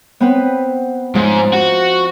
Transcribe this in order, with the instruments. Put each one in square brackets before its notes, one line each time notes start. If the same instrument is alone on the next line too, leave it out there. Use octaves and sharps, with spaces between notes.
[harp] B3 C4 B4
[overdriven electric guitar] G#2 [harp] F3
[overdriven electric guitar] F#4